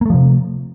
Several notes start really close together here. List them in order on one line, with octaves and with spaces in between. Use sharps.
A#3 A3 F3 C3